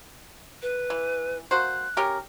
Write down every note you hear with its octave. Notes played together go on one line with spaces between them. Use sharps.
B4
E3
A#3 F#4 C5 F#6
C#4 G4 A#4